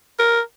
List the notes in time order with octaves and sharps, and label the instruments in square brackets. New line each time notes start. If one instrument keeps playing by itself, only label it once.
[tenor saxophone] A#4